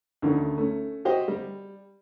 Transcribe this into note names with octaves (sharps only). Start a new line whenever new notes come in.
D2 D3 D#3 A3 C#4
A3 C#4
F#4 G4 C5 D#5
G3